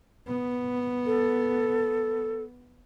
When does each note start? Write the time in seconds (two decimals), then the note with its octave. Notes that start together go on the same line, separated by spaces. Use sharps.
0.28 B3
1.06 A4